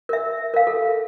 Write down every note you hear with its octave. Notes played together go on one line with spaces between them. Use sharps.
A#4 E5
A#4 F5
A4